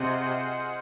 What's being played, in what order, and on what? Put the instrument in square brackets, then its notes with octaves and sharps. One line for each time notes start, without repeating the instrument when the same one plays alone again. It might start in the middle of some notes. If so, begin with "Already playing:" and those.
Already playing: [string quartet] C3 [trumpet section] F4 G#4 C5 D#5 F#5